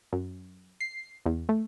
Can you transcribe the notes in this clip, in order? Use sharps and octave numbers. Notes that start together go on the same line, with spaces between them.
F#2
C7
E2
A3